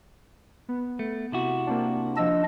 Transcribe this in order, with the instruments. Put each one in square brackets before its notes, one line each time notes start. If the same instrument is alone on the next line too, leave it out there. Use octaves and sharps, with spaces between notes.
[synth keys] B3
[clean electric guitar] A3
C3 E4 F#4
[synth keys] A#3 C4 D4
[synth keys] F3 E6 [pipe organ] D4 D#5